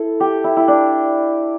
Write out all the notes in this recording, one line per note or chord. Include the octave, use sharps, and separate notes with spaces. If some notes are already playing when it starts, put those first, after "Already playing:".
Already playing: E4 A4
G4
E4
E4
D4